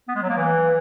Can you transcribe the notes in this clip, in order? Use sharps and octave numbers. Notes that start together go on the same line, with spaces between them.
B3
G#3
F#3
A#3
E3